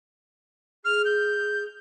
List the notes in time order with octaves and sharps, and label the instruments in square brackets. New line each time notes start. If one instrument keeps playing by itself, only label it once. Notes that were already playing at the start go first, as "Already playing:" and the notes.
[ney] G#4 [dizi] F6
[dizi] G6